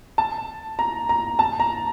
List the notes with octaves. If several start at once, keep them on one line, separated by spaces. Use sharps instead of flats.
A5
A#5
A#5
A5
A#5